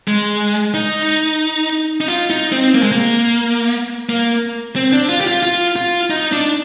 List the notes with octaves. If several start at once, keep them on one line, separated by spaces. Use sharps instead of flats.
G#3
D#4
D#4
F4
D#4
C4
A#3
G#3
A#3
A#3
C4
D4
F4
G4
F4
F4
F4
D#4
D4